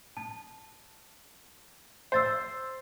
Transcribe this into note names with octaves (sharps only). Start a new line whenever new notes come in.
A5
C5 E6 A6 C7